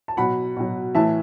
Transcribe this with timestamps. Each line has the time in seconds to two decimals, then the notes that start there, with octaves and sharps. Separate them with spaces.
0.08 A5
0.17 B2 F#3 F#5 B5
0.57 B2 F#3
0.95 A2 E3 E5 A5